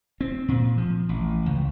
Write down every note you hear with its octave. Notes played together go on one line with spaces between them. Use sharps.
C4
A#2
F3
A1
C#2